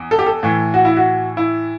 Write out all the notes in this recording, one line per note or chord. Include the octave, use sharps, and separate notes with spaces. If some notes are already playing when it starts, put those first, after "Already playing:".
Already playing: E2
A4
G4
A4
A2 E3
F#4
E4
F#4
E4